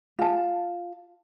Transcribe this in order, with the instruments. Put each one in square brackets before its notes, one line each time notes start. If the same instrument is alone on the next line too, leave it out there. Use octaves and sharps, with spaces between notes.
[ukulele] F4 A5